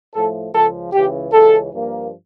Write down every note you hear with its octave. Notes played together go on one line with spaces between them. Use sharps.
A2 F3 A3 A4
C#2 C#3 F3 A4
C#2 C#3 E3 G4
C#2 C#3 E3 A4
G2 F3 A#3